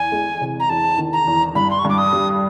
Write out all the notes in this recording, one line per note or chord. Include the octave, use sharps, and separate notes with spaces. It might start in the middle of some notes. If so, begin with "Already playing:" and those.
Already playing: E2 G#5
G#3
C3
A#5
E2 A5
D#3
A#5
E2
G2 B5
C6
C#6
G2 D6
D#6
G3